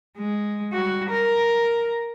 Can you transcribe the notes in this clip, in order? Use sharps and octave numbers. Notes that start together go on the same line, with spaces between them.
G#3
G3 F#4
A#4